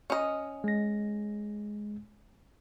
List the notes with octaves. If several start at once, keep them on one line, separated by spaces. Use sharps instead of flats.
C#4 D#5
G#3 A#6